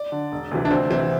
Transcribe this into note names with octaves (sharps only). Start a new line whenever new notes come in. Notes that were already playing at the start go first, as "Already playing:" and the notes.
Already playing: D5
D3
E1
D2 C3 E3
D4
D2 C4
C3 E3 C4